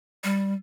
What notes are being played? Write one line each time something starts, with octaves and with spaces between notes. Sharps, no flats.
G3